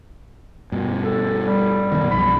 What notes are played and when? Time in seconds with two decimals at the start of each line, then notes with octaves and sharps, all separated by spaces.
0.72 G2 B2
1.04 A4
1.46 G3
1.92 F#2 B2 D#3
2.11 B1 F3 B5